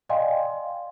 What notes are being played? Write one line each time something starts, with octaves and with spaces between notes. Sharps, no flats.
D5 D#5 F5 G5 G#5 C6